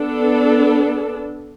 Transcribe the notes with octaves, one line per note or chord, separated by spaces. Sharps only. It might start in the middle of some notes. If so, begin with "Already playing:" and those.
Already playing: B3 D4 A4